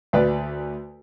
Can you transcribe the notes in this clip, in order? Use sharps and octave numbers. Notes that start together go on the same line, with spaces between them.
D2 B4 D5